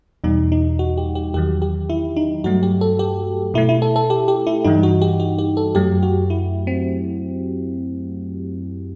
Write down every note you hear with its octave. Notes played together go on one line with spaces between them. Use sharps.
E2 B2 G3 D#4
D#4
F#4
G4
G4
E2 D#3 F#3 G4
G4
E4
D#4
G2 F#3 A3 F#4
G4
A4
G4
B2 A3 E4
E4
A4
A4
G4
G4
E4
G2 E3 G3 D#4
F#4
G4
F#4
G4
A4
F#2 F#3 A3 G4
F#4
E4
C4